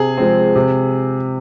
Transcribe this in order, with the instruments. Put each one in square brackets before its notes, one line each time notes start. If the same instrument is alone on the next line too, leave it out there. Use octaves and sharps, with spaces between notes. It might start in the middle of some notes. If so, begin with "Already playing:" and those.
Already playing: [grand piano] C3 [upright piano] G#4
[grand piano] F3 G#3 C4
C3